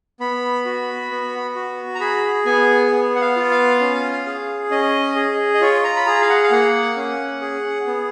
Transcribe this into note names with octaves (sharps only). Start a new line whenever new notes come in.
B3 B5
F#4
B3
F#4
A#5
G#4 B5
B3 G#5
B3
F#5
F5
F4
F5
C#4
G#4
C#4 D#5
G#4
D#5
F4 C#5
A#5
B5
G#4 A#5
F5
F#5
F5
A#3 F#5
C#4
G#4
B3